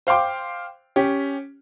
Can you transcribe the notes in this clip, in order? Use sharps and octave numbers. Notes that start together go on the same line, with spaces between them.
C5 F5 G5 C6 D6
C#4 G4